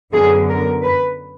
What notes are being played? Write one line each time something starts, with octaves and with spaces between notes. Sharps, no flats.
F#2 D3 F#3 B3 G#4
A#4
B4